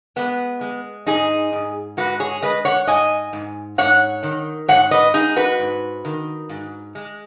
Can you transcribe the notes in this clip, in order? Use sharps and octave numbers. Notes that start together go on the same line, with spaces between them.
G#3 B3
G#3
G#2 D#4 G#4
G#2
G#3 F#4 B4
G#4 C#5
G#3 B4 D#5
C#5 F#5
G#2 D#5 G#5
G#2
G#2 C#5 F#5
D#3
G#2 C#5 F#5
B4 D#5
G#3 D#4 G#4
F#4 B4
G#2
D#3
G#2
G#3